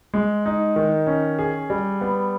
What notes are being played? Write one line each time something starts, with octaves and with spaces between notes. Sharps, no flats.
G#3
D#4
D#3
C#4
G#4
G3
B3